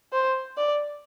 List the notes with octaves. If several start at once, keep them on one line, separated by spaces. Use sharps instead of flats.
C5
D5